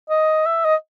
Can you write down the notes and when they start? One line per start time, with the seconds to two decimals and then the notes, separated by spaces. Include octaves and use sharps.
0.10 D#5
0.46 E5
0.65 D#5